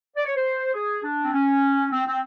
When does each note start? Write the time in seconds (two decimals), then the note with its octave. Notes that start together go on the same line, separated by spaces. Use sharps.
0.16 D5
0.25 C#5
0.35 C5
0.74 G#4
1.03 D4
1.22 C4
1.33 C#4
1.91 C4
2.06 C4